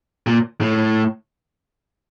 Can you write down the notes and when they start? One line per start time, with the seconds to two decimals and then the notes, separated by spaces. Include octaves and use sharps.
0.27 A#2
0.61 A2